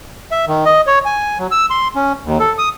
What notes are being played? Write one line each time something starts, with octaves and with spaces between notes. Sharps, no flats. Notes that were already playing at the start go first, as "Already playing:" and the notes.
E5
D#3
D#5
C#5
G#5
F#3
E6
C6
C#4
D#2
A4
D#6